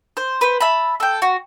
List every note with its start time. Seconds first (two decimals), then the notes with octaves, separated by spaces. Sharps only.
0.17 C5
0.41 B4 C5
0.61 E5 A5 B5
1.00 A4 G5
1.22 F#4